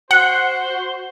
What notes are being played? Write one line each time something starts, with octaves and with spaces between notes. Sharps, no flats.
F#4 C5 F#5